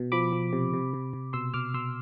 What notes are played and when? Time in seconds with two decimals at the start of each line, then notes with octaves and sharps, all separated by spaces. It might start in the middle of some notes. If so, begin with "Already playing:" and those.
Already playing: B2
0.12 F3 B5 D6
0.33 F3
0.53 C3
0.73 C3
0.94 C3
1.13 C3
1.33 B2 C6 E6
1.54 B2 D6 F6
1.74 B2 C6 E6